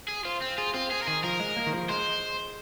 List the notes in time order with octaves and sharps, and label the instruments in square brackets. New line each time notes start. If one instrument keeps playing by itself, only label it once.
[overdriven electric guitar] G#4
[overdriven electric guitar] F4 [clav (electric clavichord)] C5
[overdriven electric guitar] C4
[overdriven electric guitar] F4 [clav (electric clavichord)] G#4
[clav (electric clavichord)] C4 [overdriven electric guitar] F4
[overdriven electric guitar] G#4
A#4
[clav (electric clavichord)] D#3 [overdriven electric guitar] G#4
[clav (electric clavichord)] F3 [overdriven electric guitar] A#4
[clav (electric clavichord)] G#3
A#3
D#3
F3
[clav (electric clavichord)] G#3 [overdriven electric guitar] C5